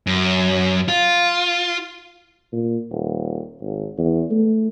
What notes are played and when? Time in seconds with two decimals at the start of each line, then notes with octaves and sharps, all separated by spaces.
0.07 F#2
0.89 F4
2.52 A#2
2.91 D#1
3.61 G#1
3.98 E2
4.30 A3